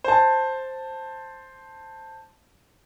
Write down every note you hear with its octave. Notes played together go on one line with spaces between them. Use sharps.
C5 A5